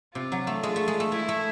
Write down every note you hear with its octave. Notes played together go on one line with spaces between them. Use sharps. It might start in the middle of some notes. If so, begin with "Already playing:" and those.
C3 F4
F#3
A3
G#3 F4
A3
G#3
A3
A3 E4
A3